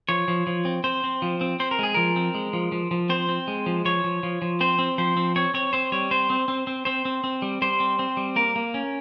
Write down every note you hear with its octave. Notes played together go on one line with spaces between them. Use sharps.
F3 C#5
F3
F3
C4
C4 C5
C4
F3
C4
C4 C5
A#4
G#3 G#4
F3 A#4
C4
G#3
F3
F3
F3
C4 C5
C4
G#3
F3
F3 C#5
F3
F3
F3
C4 C5
C4
F3 C5
C4
C4 C#5
C4 C#5
C4 C5
G3 C#5
C4 C5
C4
C4
C4
C4 C5
C4
C4
G3
G3 C5
C4
C4
G3
A#3 A#4
A#3
C#4